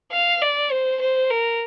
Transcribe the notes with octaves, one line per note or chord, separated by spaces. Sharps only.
F5
D5
C5
C5
A#4